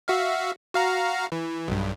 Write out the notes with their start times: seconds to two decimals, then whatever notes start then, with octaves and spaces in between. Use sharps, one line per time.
0.08 F#4 E5 F5
0.74 F#4 F5 A#5
1.32 E3
1.68 B1 G2